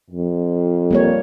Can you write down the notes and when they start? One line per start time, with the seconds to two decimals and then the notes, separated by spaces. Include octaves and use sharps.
0.10 F2
0.91 G3 A#3 C#5